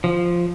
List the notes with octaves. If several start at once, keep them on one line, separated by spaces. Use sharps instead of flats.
F3